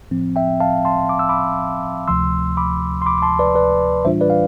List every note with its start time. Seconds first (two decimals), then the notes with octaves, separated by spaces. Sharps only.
0.11 A2 F3 C4
0.36 E5 G5
0.60 F5 A5
0.85 A5 C6
1.09 D6
1.19 E6
1.29 B5 D6
2.08 D2 C3 F3 A3 C6 E6
2.57 B5 D6
3.02 C6
3.06 B5 D6
3.18 D6
3.22 A5 C6
3.39 B4 D5
3.55 B4 D5
4.05 A2 E3 G3 D4 F4 C5 E5
4.21 B4 D5
4.30 F5